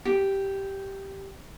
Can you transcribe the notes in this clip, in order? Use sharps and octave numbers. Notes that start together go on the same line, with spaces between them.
G4